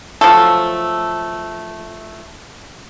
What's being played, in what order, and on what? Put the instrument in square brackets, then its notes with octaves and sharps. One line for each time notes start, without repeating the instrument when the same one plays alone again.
[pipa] F3 F#3 A3 A4